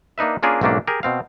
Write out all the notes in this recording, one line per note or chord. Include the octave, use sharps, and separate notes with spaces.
A#3 D4 D#4 B4 E5
A#3 C#4 D4 F4 G#4 A#4
B1 G#2 A3 A#3 C#4 D4
G4 G#4 A#4
B2 C4 F5